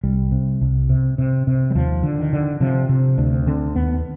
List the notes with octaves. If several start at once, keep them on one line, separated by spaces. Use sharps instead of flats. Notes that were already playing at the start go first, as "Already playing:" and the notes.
C2 G3
C3
C2
C3
C3
C3
G3
D#2 F3
D3
D#3
D3
C3 F3
C3
D2 D4
D3 C4
D#2 B3